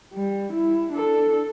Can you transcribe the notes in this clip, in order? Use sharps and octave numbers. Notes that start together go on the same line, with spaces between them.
G3
E4
D4 A4